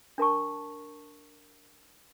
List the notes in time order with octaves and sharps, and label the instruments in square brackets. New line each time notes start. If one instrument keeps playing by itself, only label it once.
[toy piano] D4 A#4 A5 C#6